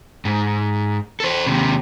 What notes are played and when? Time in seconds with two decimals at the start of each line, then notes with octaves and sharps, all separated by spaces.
0.25 G#2
1.20 A4 C5
1.47 D#2 C3